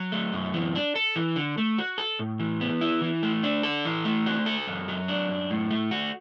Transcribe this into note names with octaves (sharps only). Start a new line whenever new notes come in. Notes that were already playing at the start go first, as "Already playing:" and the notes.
Already playing: F#3
A3
F#2
E3
D4
A4
E3
D3
A3
F#4
A4
A2
E3
B3
E4
E3
A3
D4
A4
E3
A3
F#4
A4
F#2
F#3
D4
F#2
A2
A3
F#4